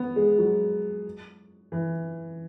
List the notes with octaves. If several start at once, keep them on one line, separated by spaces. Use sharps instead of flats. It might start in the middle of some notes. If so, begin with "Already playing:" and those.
Already playing: B3
G#3
F#3
E3